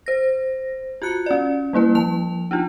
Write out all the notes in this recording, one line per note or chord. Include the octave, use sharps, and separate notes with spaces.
C5 A#6
F4 F#4 F#6 C#7
C#4 D5
G3 A#3 E4 B4
F3 A5 F7
D4 D#4 F4